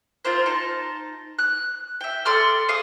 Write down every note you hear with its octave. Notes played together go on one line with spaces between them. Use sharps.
C4 F4 A#4 C5
D#4 A5
F#6
E5 G5
A4 D5 C6 F6
G#4 F5 D#6